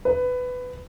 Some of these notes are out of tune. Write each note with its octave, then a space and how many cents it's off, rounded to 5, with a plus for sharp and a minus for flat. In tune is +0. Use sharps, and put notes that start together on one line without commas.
B4 +15